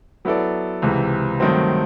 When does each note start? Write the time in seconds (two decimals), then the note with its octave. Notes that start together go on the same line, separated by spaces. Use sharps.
0.25 F#3 B3 E4 A4 D5
0.82 C#2 C3 E3
1.40 G2 D#3 F#3 A3 C4